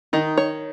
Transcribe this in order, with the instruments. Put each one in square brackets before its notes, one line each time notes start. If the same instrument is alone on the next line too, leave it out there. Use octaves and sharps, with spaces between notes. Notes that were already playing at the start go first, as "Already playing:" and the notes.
[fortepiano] D#3 [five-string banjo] D#4
[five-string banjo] C#5